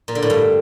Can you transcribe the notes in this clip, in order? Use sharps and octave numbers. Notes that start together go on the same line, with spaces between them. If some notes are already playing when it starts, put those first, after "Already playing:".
A#2
D3
A2
G2